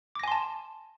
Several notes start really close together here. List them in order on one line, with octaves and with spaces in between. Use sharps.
D6 A#6 G#5 C6 A5